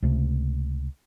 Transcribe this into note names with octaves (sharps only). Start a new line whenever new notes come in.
C#2 C3 A3